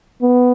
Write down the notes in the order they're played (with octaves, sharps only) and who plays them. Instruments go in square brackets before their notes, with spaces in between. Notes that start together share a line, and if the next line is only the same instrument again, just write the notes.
[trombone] B3